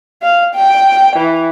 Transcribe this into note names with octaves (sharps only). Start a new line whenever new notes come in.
F5
G5
E3